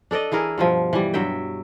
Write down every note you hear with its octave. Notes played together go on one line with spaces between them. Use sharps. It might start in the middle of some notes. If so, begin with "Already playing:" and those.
D4 A4 D5 D#5
E3 E4 G#4 A#4
G2 B2 F3
E3 G3
G2 F#3 E5 G5